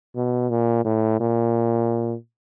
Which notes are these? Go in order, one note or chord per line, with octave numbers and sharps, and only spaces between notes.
B2
A#2
A2
A#2